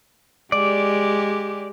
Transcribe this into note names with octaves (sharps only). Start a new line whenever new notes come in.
G#3 G4 D5